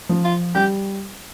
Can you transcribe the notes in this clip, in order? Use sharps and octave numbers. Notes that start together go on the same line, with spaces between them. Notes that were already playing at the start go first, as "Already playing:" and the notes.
F3
F4
G3 G4